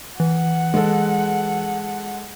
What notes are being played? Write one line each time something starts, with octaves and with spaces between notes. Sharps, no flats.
E3 F#5
G#3 A4